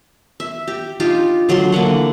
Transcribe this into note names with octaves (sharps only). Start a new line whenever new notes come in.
E5
G4
D4 D#4 F4 G4
D3 F#3 A3 C6
D3 E3 A#3 F#5